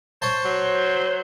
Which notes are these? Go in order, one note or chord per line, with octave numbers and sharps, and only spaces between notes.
C5 C#5 A5
F#3